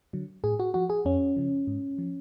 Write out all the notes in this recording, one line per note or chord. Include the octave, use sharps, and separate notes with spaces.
D3 F#3
A2 G#4
F#4
F3 F#4
G#4
F2 C#4
C#3 F3
G#2
F3